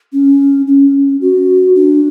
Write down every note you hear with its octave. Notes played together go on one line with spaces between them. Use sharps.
C#4
C#4
F#4
D4